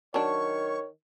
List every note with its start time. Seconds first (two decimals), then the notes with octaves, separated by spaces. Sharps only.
0.14 D#3 F#3 D4 C#5 C#6